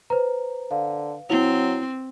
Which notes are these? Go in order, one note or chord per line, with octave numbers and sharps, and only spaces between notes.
B4 C5 A#5
D3 F5
F#3 C4 E4 F7